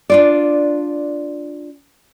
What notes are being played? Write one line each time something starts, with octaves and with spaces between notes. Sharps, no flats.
D4 F4 D5